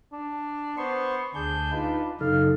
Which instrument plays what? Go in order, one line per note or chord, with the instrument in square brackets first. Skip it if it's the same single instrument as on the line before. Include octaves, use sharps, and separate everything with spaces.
[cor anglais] D4
[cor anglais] B3 [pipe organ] C5 C6 C#6
[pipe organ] D2 G#4 G6 [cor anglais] D4
[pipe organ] D#4 F4 B4
[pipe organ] F#2 [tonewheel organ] C#3 D#4 A4 [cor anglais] F5